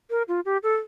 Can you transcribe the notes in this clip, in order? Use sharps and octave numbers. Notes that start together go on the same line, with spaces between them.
A#4
F4
G4
A4